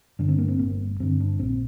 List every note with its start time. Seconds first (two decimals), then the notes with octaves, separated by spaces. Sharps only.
0.19 G2 D3 D4
0.28 C4
0.38 A#3
0.48 C4
0.59 G1 A#3
1.00 G2 D3 C4
1.20 D4
1.39 A#1 C4